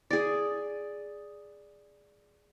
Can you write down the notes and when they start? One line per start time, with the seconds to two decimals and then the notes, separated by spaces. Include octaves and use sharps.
0.10 G#4 D5